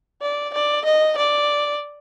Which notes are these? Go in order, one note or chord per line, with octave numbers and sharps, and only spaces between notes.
D5
D5
D#5
D5